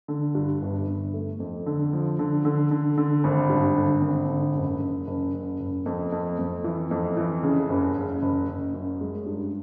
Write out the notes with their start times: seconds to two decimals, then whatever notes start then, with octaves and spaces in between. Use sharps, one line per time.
0.08 D3
0.35 G2
0.62 G1
0.87 G1
1.14 A3
1.40 F2
1.66 D3
1.93 F3
2.19 D3
2.45 D3
2.71 D3
2.97 D3
3.24 G#1
3.49 G2
3.76 D3
4.01 G#1
4.28 D3
4.54 F#1
4.80 F#1
5.07 F#1
5.33 F#1
5.60 F#1
5.86 F2
6.12 F2
6.39 F2
6.64 E3
6.91 F2
7.17 E3
7.43 C#3
7.69 F#1
7.96 F#1
8.22 F#1
8.48 F#1
8.74 F#2
9.01 G#3
9.26 G2